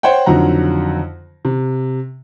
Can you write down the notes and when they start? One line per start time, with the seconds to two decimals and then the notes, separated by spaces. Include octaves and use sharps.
0.03 C5 C#5 F#5 G5
0.26 F2 D3 D#3 F#3 F#5 A#5
1.45 C3